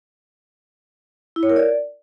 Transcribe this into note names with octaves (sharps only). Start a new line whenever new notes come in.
E4
C#5
A#4
D5